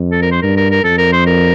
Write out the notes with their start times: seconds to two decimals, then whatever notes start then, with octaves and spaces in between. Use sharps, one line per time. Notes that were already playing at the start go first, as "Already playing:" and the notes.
Already playing: F2
0.11 A4
0.22 A#4
0.31 C5
0.42 G2 A#4
0.57 A#4
0.71 A#4
0.84 F2 A4
0.98 A#4
1.12 C5
1.26 A#4